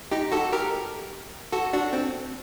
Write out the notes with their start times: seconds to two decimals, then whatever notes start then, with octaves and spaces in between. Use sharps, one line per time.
0.12 D#4 G4
0.32 F#4 A4
0.52 G4 A#4
1.52 F#4 A4
1.73 D4 F#4
1.93 C4